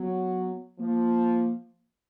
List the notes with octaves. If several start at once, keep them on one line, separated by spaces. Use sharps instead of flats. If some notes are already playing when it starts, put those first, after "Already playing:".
Already playing: F#3 B3
F3 A#3